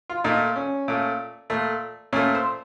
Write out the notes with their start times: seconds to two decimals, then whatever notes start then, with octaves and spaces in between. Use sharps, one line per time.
0.09 F4
0.24 A#2 A3 D#4
0.56 C#4
0.88 A#2 A3
1.50 A#2 A3
2.13 A#2 C#4
2.16 A3
2.35 C5